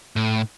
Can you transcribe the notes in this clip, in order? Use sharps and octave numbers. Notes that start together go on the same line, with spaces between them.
A2